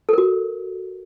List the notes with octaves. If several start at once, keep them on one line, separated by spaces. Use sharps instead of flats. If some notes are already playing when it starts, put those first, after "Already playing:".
F#4 A4 A#4